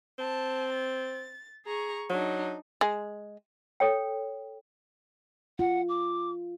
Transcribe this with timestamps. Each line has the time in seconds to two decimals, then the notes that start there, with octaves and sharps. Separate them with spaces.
0.18 C4 A5
0.72 A6
1.65 G#4 A#5 C#6
2.09 F#3 D4 D#4
2.81 G#3
3.80 A4 C#5 G5
5.59 F4 F#5
5.89 D6